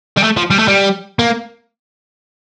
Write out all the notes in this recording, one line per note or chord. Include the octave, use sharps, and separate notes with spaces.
G3
A3
F3
G3
A3
G3
A#3